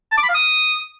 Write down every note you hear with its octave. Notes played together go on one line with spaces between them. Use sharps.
A5
D6
B5
F5
D#6